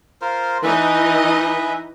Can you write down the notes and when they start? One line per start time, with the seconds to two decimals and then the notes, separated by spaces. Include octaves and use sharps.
0.22 F4 A#4 C5
0.63 E3 D#4 B4 D#5 E5 G#5